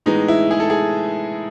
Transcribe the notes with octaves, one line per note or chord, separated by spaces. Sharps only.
A2 E3 G#3 B3 D#4
E4
G#4
A4
G#4